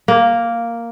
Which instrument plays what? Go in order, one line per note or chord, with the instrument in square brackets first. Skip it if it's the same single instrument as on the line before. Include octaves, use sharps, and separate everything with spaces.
[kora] A#3